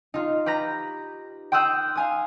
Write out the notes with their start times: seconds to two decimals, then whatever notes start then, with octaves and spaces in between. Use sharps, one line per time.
0.14 D#4 F4
0.46 G4 B4 A#5 A#6
1.52 G5 C6 D#6 E6 F#6 G6
1.95 F5 G#5 D#6